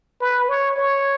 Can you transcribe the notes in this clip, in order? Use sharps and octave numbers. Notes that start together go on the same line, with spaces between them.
B4
C#5
C#5